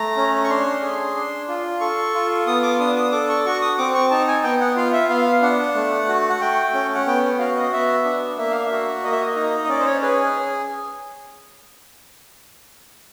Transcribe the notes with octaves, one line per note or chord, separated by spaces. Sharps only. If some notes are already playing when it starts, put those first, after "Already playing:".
Already playing: A3 A#5
C#4
C#6
D4 C6
G#4
D4
F4
A4 C#6
F4
B3 D#6
D6
D4 D#6
D#6
A4 D6
C#6
F#4 C#6
D#6
C4 D6
C#6
D#4 A5
G#5
B3 G5
F#5
F4 F5
E5
B3 F5
D4 F#5
A3
F#4
F#5
A3 G5
C#4
F#5
B3 G5
F#4 F5
D#5
B3 E5
D4
A#3 E5
F5
E5
F#4
A#3 D#5
E5
D#5
D#4
D#5
C#4 D5
C5
C#5
G#4 B4